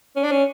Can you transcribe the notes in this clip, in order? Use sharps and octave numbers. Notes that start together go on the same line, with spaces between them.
C#4
D4
C#4